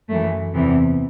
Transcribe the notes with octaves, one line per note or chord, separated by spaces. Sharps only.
F#2 E3 A3
E2 C3 E3 B3